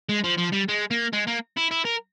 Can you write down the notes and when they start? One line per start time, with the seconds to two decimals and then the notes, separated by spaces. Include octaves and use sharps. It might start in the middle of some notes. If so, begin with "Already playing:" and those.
0.09 G#3
0.24 F3
0.38 F3
0.53 G3
0.69 G#3
0.91 A#3
1.13 G#3
1.27 A#3
1.57 E4
1.71 E4
1.85 A#4